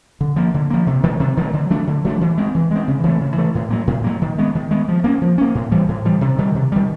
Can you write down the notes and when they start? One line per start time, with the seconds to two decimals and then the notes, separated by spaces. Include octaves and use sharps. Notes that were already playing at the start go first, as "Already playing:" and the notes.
0.21 D3
0.36 F3 A#3
0.54 D3
0.70 F3 A#3
0.87 C3
1.03 D#3 F#3 A3
1.20 C3
1.37 D#3 F#3 A3
1.53 D3
1.70 F#3 A3 D4
1.87 D3
2.05 F#3 A3 D4
2.21 E3
2.38 G#3 C4
2.55 E3
2.71 G#3 C4
2.88 C#3
3.04 E3 A3
3.21 C#3
3.37 E3 A3
3.55 A2
3.70 F#3 A#3
3.87 A2
4.04 F#3 A#3
4.21 D#3
4.38 G#3 B3
4.55 D#3
4.71 G#3 B3
4.88 F3
5.04 A#3 C#4
5.21 F3
5.38 A#3 C#4
5.55 A2
5.71 E3 G3
5.88 A2
6.05 E3 G3
6.21 C3
6.38 D#3 G3
6.55 C3
6.72 D#3 G3